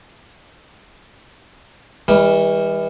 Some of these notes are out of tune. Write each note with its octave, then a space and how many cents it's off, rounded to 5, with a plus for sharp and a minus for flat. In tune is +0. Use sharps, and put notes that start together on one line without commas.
E3 -30 G3 +30